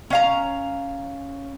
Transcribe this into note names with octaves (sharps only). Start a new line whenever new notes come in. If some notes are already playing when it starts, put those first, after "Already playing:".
C#4 F5 A#5